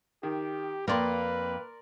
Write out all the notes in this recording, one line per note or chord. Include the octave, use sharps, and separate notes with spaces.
D#3 G4
F2 A#3 A#4 B4 D5 C6